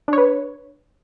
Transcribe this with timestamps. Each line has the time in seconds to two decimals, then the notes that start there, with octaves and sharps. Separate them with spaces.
0.08 D4
0.13 C#5
0.18 B4